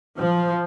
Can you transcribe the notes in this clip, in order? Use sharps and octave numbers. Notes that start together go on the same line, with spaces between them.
F3